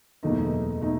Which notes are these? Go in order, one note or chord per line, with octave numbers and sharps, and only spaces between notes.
F#1 E2 B2 A3 D#4
B2 A3 D#4